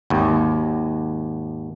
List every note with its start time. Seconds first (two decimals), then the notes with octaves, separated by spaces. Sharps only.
0.10 G#1 D#2